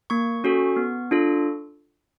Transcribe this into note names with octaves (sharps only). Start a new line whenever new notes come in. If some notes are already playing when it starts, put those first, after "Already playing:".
A#3 C#6
C#4 F#4 A4
B3
D4 F4 A4